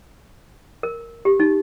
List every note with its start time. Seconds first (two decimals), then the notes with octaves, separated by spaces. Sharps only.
0.83 A#4
1.25 G4
1.40 D#4